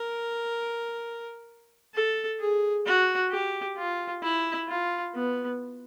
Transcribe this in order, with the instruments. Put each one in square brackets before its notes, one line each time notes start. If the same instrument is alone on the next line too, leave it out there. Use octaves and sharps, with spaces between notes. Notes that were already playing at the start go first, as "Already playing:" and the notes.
Already playing: [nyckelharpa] A#4
A4
G#4
F#4
G4
F4
E4
F4
B3